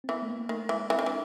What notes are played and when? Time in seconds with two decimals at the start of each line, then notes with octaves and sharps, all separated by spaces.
0.04 C4
0.09 E3 B3
0.22 A3
0.29 A#3
0.49 D#3 A3
0.69 E3 G#3
0.89 E3 C4
0.99 D#3
1.06 E3 D4